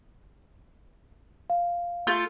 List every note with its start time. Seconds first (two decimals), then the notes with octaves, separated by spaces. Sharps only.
1.50 F5
2.07 A3 F4 G6